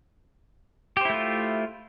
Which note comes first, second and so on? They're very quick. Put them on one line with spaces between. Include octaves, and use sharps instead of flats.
G4 C5 E4 A3 F4